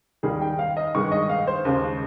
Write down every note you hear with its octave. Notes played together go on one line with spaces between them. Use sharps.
D#2 D#3 G3 G#4
G5
F5
D#5
G2 D#3 G#3 C#6
D#5
F5
C5
D#2 C#3 G#3